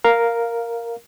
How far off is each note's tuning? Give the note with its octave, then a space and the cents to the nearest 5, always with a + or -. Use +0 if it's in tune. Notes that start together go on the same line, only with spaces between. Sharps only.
A#4 +0 F5 +0